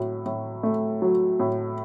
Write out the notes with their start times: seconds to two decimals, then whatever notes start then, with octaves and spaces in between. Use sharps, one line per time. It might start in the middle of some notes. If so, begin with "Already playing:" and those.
Already playing: A2 F#3
0.26 A2
0.63 A3
1.02 F#3
1.39 A2